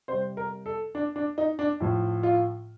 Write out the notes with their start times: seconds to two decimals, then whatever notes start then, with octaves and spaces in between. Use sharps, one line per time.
0.08 C3 G3 C5
0.37 A#4
0.66 A4
0.95 D4
1.16 D4
1.38 D#4
1.59 D4
1.80 A2 F3
2.23 F4